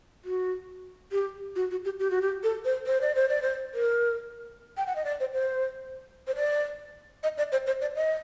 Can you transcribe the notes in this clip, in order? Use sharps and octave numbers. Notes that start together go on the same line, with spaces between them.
F#4
G4
F#4
F#4
G4
G4
F#4
G4
A4
C5
C5
D5
C5
D5
C5
A#4
G5
F#5
D#5
D5
C5
C5
C5
D5
D#5
D5
C5
C5
D5
D#5